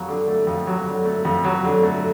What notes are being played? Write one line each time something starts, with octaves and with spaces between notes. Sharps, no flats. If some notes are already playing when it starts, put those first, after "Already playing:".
Already playing: F2 F#3
D3
A3
F2
F#3
D3
A3
F2
F#3
D3
A3